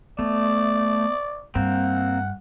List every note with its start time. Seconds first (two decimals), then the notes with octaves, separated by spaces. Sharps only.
0.19 A3 B3 D5
1.55 G2 A#3 C4 F#5